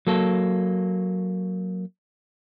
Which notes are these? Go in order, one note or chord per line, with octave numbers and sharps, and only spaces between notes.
F#3 A#3 A4